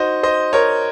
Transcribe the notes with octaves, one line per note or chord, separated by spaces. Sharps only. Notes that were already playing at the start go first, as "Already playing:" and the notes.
Already playing: D#4 F#4 C5 D#5
C5 D#5
A#4 C#5